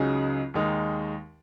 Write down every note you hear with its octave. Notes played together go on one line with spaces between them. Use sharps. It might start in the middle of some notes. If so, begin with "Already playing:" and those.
Already playing: C#2 C#3 F#3 D#4 G#4
D#2 D#3 G#3 D#4